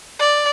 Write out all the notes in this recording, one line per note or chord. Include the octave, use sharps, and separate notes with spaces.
D5